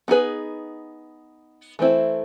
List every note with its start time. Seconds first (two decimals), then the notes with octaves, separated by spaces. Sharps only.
0.08 B3 D#4 G#4 B4
1.79 E3 A3 C4 E4